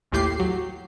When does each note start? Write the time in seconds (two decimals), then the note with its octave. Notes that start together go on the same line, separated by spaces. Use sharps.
0.12 A1 D#2 A2 G4 C7
0.40 F#3